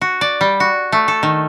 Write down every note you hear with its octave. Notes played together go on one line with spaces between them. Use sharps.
F#4
D5
G3
F#4
A3
A4
D#3